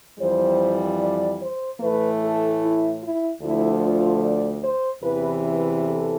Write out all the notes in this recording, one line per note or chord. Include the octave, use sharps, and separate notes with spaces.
F2 E3 G3 C5
D5
C5
A2 E3 A3 B4
A4
E4
E4
D2 D3 F3 A3 E4
F4
D5
C5
E2 C3 E3 B4
B4
A4